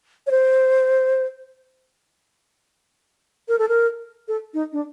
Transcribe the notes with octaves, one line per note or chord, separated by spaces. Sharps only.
C#5
C5
A#4
A4
A#4
A4
D#4
D4